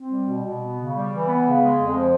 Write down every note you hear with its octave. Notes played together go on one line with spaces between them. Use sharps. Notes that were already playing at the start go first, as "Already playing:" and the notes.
Already playing: C4
G3
B2
B2
B3
C#3
G3
E3
B3
C#3
G#3
F2
F3